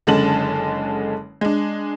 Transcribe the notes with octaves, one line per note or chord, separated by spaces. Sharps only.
F#1 D3 G#3 C#4 A5 F#7
G#3 D4